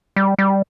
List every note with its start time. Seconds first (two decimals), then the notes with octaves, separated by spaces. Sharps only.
0.16 G3
0.39 G3